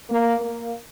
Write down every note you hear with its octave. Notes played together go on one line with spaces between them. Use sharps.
A#3
A#3